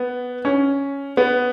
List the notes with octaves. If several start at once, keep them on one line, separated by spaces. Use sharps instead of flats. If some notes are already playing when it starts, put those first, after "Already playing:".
Already playing: B3
C#4
B3